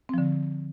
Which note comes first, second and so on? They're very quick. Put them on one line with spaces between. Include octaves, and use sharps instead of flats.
C4 F3 D3